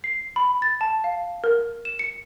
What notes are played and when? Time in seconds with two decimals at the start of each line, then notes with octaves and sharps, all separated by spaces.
0.04 C7
0.36 B5
0.62 A6
0.81 A5
1.04 F5
1.44 A#4
1.85 E7
1.99 C#7